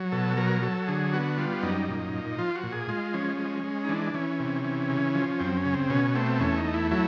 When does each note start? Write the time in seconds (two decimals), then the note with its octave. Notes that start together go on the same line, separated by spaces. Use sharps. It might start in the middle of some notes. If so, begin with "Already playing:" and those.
Already playing: F#3
0.12 B2 A4
0.37 F#3 A#4
0.62 F#3 A4
0.87 D3 G#4
1.13 B3 F#4
1.38 G3 F4
1.63 F#2 D#4
1.88 A#2
2.13 A#2
2.38 F3 F4
2.55 F#4
2.64 A#2
2.72 G#4
2.88 G#3 F4
3.14 F3 C#4
3.38 G#3
3.64 G#3
3.85 D#4
3.89 E3 D4
4.14 E3 C#4
4.40 C3
4.64 E3
4.90 C#3
5.15 F3
5.40 F#2 C4
5.57 C#4
5.65 C#3
5.74 C4
5.90 B2 C#4
6.15 A3 C4
6.40 E2 C#4
6.58 D#4
6.65 A3
6.74 E4
6.91 F#3 E4